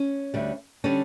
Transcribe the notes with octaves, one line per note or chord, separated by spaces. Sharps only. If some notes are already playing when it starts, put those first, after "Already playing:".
Already playing: C#4
D2 D3 G3
D3 G3 C#4